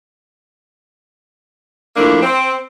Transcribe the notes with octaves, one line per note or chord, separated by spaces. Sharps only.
F3 A3 A#3 D4 E4
C4